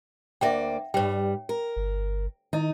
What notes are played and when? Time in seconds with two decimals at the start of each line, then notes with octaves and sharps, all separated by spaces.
0.41 D2 A#3 D5 E5 F#5 G5
0.94 G2 G3 C#5 G5
1.49 A#4
1.76 G1
2.53 D#3 D#4 E4 D#5